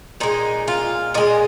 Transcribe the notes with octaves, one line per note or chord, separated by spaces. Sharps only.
A#2 G#3 D#4
F4
A#2 G#3 D#5